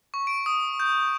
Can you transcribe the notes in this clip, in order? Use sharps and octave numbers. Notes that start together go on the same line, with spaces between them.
C#6
D7
D#6
G6